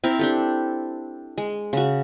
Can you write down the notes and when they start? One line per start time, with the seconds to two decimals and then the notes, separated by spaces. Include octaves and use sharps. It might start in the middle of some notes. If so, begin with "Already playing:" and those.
0.04 C4 E4 A#4
0.19 D4 G4 A4
1.38 G#3
1.73 C#3 F#4